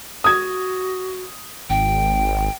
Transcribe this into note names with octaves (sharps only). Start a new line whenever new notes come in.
F#4 D#6 G#6
G#1 G5